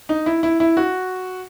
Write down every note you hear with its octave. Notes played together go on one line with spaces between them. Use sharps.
D#4
E4
E4
E4
F#4